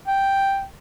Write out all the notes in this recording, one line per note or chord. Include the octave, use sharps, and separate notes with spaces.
G5